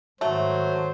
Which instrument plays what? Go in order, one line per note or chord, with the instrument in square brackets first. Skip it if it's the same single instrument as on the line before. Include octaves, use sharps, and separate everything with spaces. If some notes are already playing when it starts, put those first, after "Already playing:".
[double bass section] G#2 D#3 [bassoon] F#3 [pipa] A3 [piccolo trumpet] C5